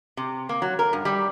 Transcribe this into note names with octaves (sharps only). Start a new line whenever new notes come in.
C3
A#3
F#3
A#4
G2
G3